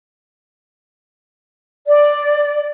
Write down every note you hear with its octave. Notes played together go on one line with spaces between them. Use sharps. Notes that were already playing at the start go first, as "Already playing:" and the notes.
D5